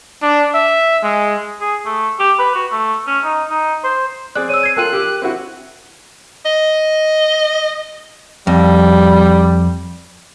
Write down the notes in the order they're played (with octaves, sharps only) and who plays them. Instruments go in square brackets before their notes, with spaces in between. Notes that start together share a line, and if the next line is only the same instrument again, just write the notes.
[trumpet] D4
E5
G#3
[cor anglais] G#4
A3
G4
B4
F#4
A3
C#4
D#4
D#4
C5
[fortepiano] C4 G#4 D5 [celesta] F#6
[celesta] C#5 E6 [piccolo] D#7
[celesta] G#6 C7
[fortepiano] F4 A4 [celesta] A#4 G5 D#7 [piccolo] F#6
[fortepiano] G4 E6
C4 E4 F#4
[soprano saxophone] D#5
[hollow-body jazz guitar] F2 [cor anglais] G3